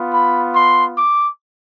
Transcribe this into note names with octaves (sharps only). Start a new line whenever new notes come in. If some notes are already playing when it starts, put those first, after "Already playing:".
Already playing: B3 F4
B5
C6
D6